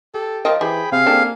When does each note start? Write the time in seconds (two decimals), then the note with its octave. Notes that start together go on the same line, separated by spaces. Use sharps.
0.14 G4 A4
0.45 F3 A#4 D#5 G5
0.61 E3 G4 G#4 C5 G5 B5
0.92 C3 C4 G#4 F5
1.06 A#3 D4 G4 A4